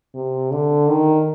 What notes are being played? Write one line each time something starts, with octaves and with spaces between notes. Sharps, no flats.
C3
D3
D#3